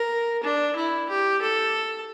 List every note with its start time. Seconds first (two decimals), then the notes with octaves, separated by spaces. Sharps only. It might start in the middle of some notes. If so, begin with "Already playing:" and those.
Already playing: A#4
0.43 D4
0.76 E4
1.09 G4
1.42 A4